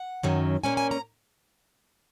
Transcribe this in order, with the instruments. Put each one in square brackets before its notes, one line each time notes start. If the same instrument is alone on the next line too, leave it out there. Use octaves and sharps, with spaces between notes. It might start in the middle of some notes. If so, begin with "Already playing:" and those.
Already playing: [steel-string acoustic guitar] F#5
F#2 D#3 F#3 C#4
A#2 A#3 C#4 G#5
G#5
A#5